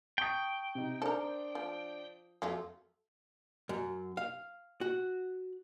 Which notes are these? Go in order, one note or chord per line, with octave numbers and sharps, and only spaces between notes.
G5 A5 C#6 D#6
C3 D#4
D4 A4 A#4 C5
F3
F2 F#3 A3 F4
F#2
F5
F#4